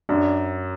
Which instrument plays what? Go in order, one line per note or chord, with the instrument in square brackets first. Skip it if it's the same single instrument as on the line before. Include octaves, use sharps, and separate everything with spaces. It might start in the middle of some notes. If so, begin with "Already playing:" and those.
[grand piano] F#2 [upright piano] D4